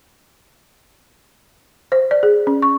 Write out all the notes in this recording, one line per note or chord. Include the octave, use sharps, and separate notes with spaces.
C5
D5
G#4
C#4
C#6